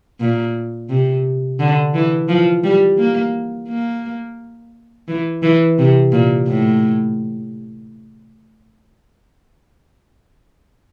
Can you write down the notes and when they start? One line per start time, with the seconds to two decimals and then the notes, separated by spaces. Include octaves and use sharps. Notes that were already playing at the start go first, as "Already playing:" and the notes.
0.20 A#2
0.89 C3
1.60 D3
1.94 E3
2.28 F3
2.63 G3
2.98 A#3
3.69 A#3
5.08 E3
5.43 E3
5.78 C3
6.12 A#2
6.47 A2